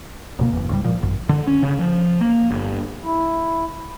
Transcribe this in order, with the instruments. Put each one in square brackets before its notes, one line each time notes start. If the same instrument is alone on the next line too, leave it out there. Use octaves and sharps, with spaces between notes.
[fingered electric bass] D1 B2 A#3
F#1 E2
C#2 G#2 G3
A#2 F3
G#1 F#2
[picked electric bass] D3
C#4
C#3
F3
A#3
G1
[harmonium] E4